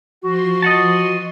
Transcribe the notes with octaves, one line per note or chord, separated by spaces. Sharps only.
F3 F#4 C6
D#5 F#5 A5